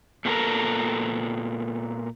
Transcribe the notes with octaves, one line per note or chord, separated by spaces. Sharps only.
A#2 A3 B3 E4 A4 A#4